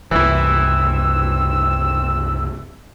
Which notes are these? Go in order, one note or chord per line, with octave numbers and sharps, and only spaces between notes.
F#1 C2 E3 C4 E4 A4 E6